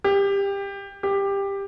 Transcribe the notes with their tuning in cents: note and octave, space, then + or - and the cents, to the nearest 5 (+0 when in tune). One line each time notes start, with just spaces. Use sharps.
G4 +20
G4 +15